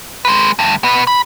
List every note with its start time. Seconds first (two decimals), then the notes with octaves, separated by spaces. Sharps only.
0.25 G#3 B4
0.59 D2 G2
0.83 B2 B4
1.07 B5